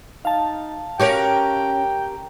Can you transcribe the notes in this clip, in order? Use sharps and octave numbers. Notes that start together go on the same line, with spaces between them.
D#4 F5 A5
C#4 F#4 G4 A#4 C#5 G5